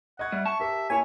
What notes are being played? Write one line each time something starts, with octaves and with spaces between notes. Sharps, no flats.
D#5 F#5 C#6 G#6
G3 E5
A5 C#6
G4 A#4 E5
A#3 E4 A#4 C#5 G#5